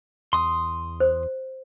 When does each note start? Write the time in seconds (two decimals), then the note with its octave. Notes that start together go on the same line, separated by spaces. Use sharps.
0.33 E2 C6 D#6
1.00 C5